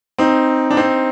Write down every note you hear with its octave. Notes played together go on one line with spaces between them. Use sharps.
C4 D#4
D4
C4 D#4